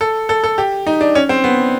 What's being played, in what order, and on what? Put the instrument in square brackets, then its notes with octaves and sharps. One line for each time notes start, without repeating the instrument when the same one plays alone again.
[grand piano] A4
A4
A4
G4
D#4
D4
C#4
C4
B3